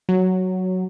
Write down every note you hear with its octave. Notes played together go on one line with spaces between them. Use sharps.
F#3